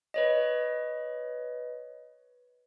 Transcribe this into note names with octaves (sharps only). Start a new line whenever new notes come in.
B4 C#5 D#5